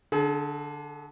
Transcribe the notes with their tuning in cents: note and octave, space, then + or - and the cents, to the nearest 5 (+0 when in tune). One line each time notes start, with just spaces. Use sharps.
D3 +0 G#4 +40